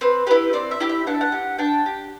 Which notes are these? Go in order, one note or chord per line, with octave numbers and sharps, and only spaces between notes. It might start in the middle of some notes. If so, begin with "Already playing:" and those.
C4 B4
E4 G4 B4
C4 D5
E5
E4 G4
E5
D4 F#5
E5
F#5
G4
D4 G5
G4